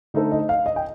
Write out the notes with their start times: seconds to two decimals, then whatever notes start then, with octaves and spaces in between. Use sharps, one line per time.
0.14 D3 A3 D#4 A4 C5
0.32 D#5
0.49 F5
0.66 D#5
0.76 G5